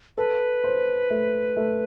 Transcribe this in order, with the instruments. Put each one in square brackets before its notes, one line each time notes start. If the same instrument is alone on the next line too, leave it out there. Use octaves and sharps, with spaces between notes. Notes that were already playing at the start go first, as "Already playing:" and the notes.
[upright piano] A4 [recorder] B4
[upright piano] C5
A3
A3